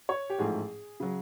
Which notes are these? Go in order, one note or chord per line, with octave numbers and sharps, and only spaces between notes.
C#5
G4
A1 G#2 F3 A3 G#4
C#3 F#3